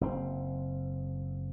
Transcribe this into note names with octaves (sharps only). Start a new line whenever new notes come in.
F#1 C4